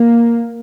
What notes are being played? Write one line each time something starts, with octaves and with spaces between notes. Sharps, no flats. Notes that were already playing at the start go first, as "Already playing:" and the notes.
Already playing: A#3